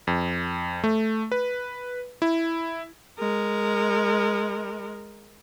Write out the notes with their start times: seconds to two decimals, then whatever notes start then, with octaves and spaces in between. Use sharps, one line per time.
0.07 F2
0.84 A3
1.32 B4
2.22 E4
3.19 G#3 A#4